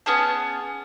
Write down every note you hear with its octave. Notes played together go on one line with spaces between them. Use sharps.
B3 C#4 G#4 A5